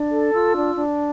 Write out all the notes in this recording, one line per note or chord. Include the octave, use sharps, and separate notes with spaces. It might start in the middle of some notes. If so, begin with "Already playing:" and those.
Already playing: D4
A4
F4 E6
D4
D4